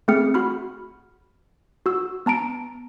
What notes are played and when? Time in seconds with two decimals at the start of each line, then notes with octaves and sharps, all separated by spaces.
0.08 A3 C4 G#4 F6 C#7
0.34 F#4 B5 F6
1.86 F#4 E6
2.26 B3 A5 A#5 D7